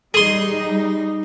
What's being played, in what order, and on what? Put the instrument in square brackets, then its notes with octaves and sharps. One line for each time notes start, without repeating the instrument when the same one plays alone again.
[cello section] G3 D#4 [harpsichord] G#4 C6